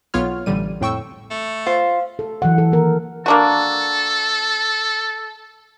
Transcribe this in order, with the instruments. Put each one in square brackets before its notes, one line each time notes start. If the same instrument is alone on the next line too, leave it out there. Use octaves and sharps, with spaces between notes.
[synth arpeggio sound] B1 B3 F4 C#5 F6
A1 D3 G3 D#7
F2 A2 G5 C#6 E6
[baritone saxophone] A3
[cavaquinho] F4 [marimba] C5 [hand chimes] F5
[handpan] A4
E3 F#3 F#5
A4
D#3 A#3 A#4
[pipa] A#3 D4 F#4 [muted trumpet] A4